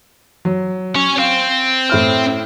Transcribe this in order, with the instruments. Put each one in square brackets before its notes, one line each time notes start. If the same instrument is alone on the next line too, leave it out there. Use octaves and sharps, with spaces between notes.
[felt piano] F#3
[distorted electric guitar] C#4 C#5
[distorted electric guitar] C4 [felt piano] F5
[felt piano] A2 E4 F6